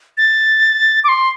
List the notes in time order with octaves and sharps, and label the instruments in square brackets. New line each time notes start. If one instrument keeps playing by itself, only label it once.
[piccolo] A6
D6
C6